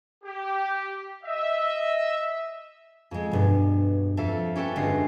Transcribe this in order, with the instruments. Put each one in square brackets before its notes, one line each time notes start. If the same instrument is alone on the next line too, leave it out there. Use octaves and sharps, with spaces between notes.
[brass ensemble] G4
D#5 E5
[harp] F2 G#3
B1 G2 B2
F2 A4 E5 F5
C#4 G4 A4 B4 G5
G1 G#3 D4 F#4 A#4 C7